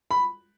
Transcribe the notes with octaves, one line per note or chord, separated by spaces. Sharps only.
B5